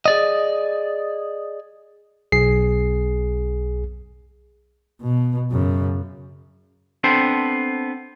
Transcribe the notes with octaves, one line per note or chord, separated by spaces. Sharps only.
G#4 D5 D#5
B1 G#4 C7
B2
F#2 C#3
B3 C4 D4 A4 C5